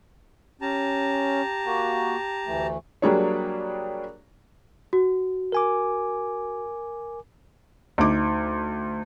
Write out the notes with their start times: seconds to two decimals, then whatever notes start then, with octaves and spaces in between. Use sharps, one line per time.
0.61 C#4 G4 A5 A#5
1.65 A#3 F#4
2.47 D2 E3 A3
3.02 F#3 G3 A#3 D4 G#4 C#5
4.93 F#4
5.52 A#4 G#5 D6
7.98 D2 D#4 D6